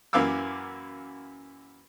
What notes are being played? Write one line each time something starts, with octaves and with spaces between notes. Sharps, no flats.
F#2 E3 A#3 F5 D6 E6